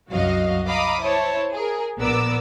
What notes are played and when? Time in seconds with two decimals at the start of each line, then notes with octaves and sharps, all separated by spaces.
0.11 C2 F#2 F#3 F#4 D#5 F5
0.67 D#5 F5 A#5 B5 D6 D#6
1.01 E4 C5 C#5 A5
1.53 G#4 A#4
1.98 A#1 B3 A#4 D5 D6 E6